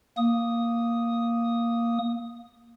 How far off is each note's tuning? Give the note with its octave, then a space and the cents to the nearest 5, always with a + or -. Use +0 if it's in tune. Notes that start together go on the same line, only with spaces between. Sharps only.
A#3 +0 D#6 +0